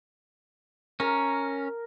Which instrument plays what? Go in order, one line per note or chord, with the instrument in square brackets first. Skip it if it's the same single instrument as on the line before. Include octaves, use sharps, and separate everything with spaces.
[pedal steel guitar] C#4 [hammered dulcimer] A#4